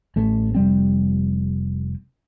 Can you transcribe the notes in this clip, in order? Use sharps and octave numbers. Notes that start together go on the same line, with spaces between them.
A1 A3
F1 G3 C4